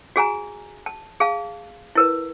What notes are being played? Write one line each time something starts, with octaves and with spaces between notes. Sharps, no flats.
F#4 G#4 G#5 A#5
A5
G#4 F5 A5
E4 A#4 B4